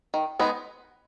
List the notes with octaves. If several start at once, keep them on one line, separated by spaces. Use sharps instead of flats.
D#3
G#3 B3 D#4